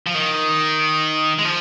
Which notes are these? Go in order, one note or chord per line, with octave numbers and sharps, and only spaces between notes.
F3
D#3
G#3
F3